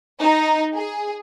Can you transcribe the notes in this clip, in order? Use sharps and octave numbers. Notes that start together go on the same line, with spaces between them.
D#4
G#4